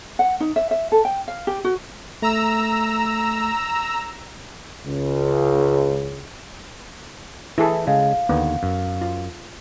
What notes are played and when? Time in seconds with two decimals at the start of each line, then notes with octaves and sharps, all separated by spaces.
0.19 F#5
0.40 D#4
0.56 E5
0.71 E5
0.92 A4
1.05 G5
1.28 F5
1.47 G4
1.64 F#4
2.22 A3 A#5 E6
4.86 C#2 C#3
7.58 E3 E4 G#4 A4 E5
7.87 C#3 G#3 F5
8.29 D#2 D3 B3
8.63 F#2
9.01 F4